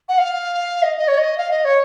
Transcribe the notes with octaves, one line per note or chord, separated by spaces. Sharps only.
F#5
F5
D#5
D#5
C#5
D#5
F5
D#5
C#5